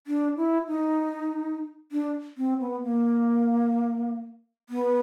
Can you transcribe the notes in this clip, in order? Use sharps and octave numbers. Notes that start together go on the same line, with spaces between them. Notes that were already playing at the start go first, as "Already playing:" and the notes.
D4
E4
D#4
D4
C4
B3
A#3
B3